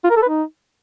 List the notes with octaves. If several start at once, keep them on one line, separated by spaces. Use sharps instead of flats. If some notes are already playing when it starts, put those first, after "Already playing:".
F4
A#4
A4
B4
D#4